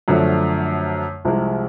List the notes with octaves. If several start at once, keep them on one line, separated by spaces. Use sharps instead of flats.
F#2 D3 F3 A3
C2 C3 F3 G#3